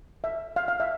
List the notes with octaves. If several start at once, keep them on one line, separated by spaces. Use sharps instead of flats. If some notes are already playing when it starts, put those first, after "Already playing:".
E5
F5
F5
E5